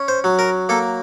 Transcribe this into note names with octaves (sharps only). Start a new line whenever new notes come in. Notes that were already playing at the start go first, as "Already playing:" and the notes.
Already playing: C#4
C5
F#3
A#4
A#3 A4